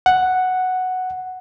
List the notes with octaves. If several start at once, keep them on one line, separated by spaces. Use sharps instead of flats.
F#5